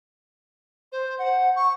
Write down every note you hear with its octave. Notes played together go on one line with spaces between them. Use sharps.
C5
F#5
C#6